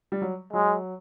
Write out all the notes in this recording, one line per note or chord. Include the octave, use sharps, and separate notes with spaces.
G3
F#3
F#3 G#3